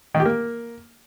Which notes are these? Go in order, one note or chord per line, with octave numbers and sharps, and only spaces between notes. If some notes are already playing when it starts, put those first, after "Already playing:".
D#3
G4
A#3